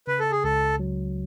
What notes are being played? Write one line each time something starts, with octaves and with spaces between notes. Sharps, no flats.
C#3 B4
A4
G#4
C#2 A4
F#3